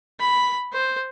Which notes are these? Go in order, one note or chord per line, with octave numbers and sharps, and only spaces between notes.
B5
C5